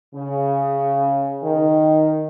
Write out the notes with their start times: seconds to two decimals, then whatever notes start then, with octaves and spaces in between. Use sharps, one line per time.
0.14 C#3
1.44 D#3